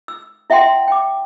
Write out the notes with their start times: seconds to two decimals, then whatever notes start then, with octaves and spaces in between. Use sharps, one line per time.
0.08 E6
0.50 E4 E5 F#5 G5 C6
0.88 G5 D6